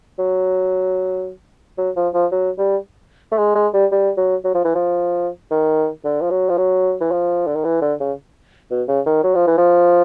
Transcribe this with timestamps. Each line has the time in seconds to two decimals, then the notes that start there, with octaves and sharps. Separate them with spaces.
0.19 F#3
1.78 F#3
1.96 F3
2.14 F3
2.31 F#3
2.58 G3
3.32 A3
3.38 G#3
3.55 G#3
3.74 G3
3.92 G3
4.17 F#3
4.45 F#3
4.54 F3
4.65 E3
4.75 F3
5.51 D#3
6.04 D3
6.21 F3
6.31 F#3
6.49 F3
6.57 F#3
7.01 E3
7.11 F3
7.46 D3
7.55 D#3
7.64 E3
7.81 D3
8.00 C#3
8.71 B2
8.88 C#3
9.06 D#3
9.24 F#3
9.35 F3
9.47 E3
9.58 F3